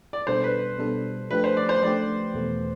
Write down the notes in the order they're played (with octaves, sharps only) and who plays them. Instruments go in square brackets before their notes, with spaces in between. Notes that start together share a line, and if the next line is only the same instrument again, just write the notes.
[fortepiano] D5
[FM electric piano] B2 G3 D4 A4 [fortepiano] C5
[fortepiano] B4
[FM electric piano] B2 G3 D4 A4
[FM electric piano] F3 A3 D4 G4 [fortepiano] B4
[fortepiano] C5
D5
C5
[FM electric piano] F3 A3 D4 G4 [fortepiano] D5
[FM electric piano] E2 B2 A3